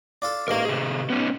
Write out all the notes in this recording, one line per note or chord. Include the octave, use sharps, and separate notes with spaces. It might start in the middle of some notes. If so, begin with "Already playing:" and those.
D4 F4 A4
A1 G#2 A3 A#4 F5
C3 G#4
B3 C#4 D#4